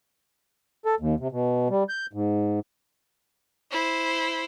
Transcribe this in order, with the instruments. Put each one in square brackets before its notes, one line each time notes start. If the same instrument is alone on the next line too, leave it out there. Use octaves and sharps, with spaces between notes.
[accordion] A4
D#2
C3
B2
G3
G6
G#2
[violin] E4 C5